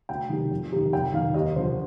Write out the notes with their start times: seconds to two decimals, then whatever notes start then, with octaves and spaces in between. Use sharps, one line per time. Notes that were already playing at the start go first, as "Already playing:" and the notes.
0.09 D2 G5
0.30 C3 D#3
0.51 F2
0.72 C3 D#3
0.93 F2 G5
1.13 D#3 F5
1.34 D#2 D#5
1.56 D3 F3 C5